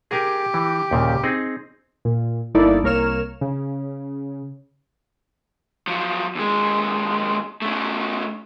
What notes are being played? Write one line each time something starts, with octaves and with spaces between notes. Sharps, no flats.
G4 G#4 A#4 G#5
E3
D#2 A#2 C#3
C4 D#4 G#4
A#2
G1 A#3 D#4 E4 A4 D5
C2 A#3 A#4 C#5 F6 E7
C#3
F3 F#3
D#2 G#3
C#3 A3